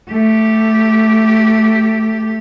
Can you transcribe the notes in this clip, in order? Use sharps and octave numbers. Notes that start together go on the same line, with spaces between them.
A3 G4